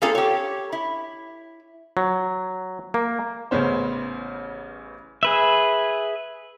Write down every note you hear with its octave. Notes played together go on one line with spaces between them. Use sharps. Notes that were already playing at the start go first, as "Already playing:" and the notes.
A#3 C4 D4 F4 G#4 A4
G4 C#5
E4
F#3
A#3
A1 C#3 B3 C#4 C5
G#4 B4 E5